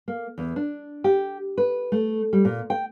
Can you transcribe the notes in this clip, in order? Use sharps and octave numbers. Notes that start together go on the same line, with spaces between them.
A#3
E2
D4
G4
B4
A3
G3
A#2
G5